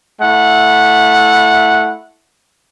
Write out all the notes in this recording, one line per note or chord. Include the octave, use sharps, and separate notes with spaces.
A3 E4 F#5